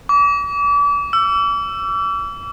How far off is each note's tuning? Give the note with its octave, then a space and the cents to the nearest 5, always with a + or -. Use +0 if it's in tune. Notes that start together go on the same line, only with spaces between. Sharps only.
D6 -40
E6 +25